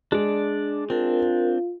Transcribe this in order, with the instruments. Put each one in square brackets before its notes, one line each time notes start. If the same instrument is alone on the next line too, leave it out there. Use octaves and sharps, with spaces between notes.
[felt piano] G#3 [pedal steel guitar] D4 D5
[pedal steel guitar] C4 D4 [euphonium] F4 [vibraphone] A#4